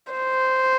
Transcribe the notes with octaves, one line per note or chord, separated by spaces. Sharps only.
C5